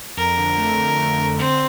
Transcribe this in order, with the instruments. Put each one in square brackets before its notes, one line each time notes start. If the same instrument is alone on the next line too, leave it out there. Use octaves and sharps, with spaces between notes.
[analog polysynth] F2 [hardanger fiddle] A#4
[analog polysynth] D3
A3
F2
F2
D3
[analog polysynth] D3 [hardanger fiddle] C4